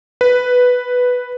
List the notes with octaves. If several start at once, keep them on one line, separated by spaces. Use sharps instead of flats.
B4